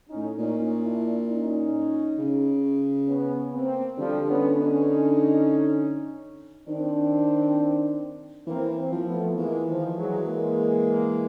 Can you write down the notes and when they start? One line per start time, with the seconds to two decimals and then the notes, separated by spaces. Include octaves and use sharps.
0.09 C#4 D#4
0.16 A2
0.38 A#2 C#4 D#4
0.84 D4 E4
1.28 C#4 D#4
2.18 C#3
3.08 B3 C#4
3.53 A#3 C4
3.98 D3 F3 G3
4.28 B3 C#4
4.58 C#4 D#4
6.67 D#3 C4 D4
8.47 E3 A#3 C4
8.77 A#3 C4
8.92 F3
9.07 A3 B3
9.37 E3 G#3 A#3
9.67 D#3 F3
9.97 F#3 G#3
10.27 G#3 A#3